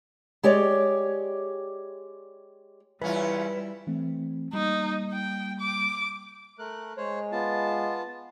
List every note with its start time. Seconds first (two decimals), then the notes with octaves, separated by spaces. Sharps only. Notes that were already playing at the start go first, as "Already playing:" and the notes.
0.43 G#3 G4 C#5 D5
3.02 E2 G3 C#4 E4 F4 B4
3.87 E3 A3 C4
4.53 G3 A#3 D#4
5.12 G5
5.60 D6
6.59 A3 A#4 F#6
6.97 G#3 C5 C#5
7.32 B3 F4 A5